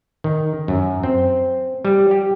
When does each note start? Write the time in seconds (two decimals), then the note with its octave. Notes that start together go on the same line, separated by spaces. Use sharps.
0.24 D#3
0.68 F#2
1.03 C4
1.85 G3
2.11 G4